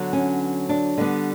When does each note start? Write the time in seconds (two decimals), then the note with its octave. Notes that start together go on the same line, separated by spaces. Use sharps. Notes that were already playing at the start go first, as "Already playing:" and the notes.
Already playing: D3 F#3 B3
0.13 C#4
0.69 D4
0.98 D3 G3 B3